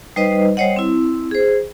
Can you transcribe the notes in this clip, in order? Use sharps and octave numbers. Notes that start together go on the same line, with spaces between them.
G3 D#4 B4 C5 D#5
G3 C5 C#5 D#5 F#5
C4 E4
G#4 C5